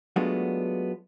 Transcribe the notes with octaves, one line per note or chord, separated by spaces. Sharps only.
F#3 G#3 A3 B3 D4 F4